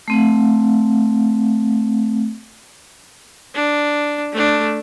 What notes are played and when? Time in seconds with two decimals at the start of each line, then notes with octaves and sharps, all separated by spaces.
0.08 A3 C4
3.55 D4
4.33 A3 D4